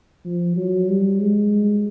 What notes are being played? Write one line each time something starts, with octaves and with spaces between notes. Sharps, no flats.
F3
F#3
G3
G#3